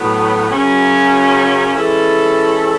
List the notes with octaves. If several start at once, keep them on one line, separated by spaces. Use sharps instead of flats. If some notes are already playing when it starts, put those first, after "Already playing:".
Already playing: A2 F#3 B3
F#2 C#3 F#3 C#4
E3 G#3 C#4 E4 A4